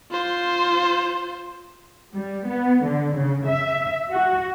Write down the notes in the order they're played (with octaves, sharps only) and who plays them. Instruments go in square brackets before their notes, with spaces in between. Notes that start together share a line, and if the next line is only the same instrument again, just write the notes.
[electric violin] F4 C5
[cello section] G3
B3
D3
C#3
E5
F#4